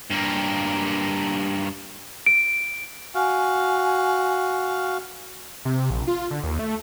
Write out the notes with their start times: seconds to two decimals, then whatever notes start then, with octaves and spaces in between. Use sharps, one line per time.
0.11 G2 A#3
2.26 D7
3.15 F#4 F5 G#5
5.65 C3
5.90 A#1
6.07 F4
6.31 D3
6.44 D#2
6.59 A3